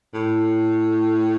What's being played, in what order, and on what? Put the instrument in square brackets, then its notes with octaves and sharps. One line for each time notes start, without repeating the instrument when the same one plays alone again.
[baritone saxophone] A2